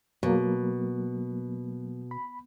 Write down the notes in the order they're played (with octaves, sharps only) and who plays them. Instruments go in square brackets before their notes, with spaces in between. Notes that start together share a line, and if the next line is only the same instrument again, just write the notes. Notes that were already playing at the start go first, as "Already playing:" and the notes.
[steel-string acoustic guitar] B2 [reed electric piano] F#3 A#3
[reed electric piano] B5